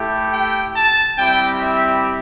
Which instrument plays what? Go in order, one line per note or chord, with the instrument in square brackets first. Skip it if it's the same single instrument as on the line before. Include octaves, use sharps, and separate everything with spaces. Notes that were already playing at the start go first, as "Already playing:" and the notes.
Already playing: [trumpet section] A3 E4 G4
G5
A5
G3 C4 E4 G4 G5
E5